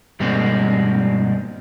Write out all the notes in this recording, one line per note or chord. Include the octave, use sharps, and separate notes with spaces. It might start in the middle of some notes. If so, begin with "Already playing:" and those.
G2 B2 G#3 A#3 C4